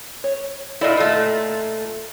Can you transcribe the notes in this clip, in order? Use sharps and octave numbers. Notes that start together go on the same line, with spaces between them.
C#5
A#2 E4 A4 D5 D#5
A#2 A3